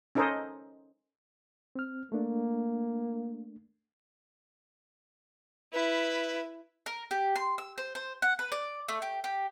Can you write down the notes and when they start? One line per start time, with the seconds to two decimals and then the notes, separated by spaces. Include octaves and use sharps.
0.15 C#4 D#4 A4 A#4 C5 D#5
1.76 C4 F6
2.12 A3 A#3 D4
5.73 E4 B4
6.86 A#4
7.11 G4
7.36 C6
7.58 E6
7.78 C5
7.95 C5
8.22 F#5
8.39 B4
8.52 D5
8.88 A3
9.02 G4
9.24 G4